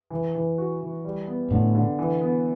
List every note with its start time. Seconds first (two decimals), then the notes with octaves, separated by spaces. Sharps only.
0.10 E3
0.35 E3
0.58 F#4
0.81 E3
1.05 G3
1.27 B3
1.51 A2 D3
1.75 D3
1.99 E3
2.21 B3